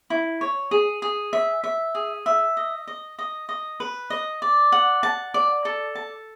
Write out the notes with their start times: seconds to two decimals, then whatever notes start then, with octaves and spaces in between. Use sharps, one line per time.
0.10 E4
0.41 C#5
0.71 G#4
1.02 G#4
1.33 E5
1.64 E5
1.95 G#4
2.26 E5
2.57 D#5
2.87 D#5
3.19 D#5
3.49 D#5
3.80 B4
4.10 D#5
4.42 D5
4.72 F#5
5.03 A5
5.34 D5
5.65 A4
5.95 A5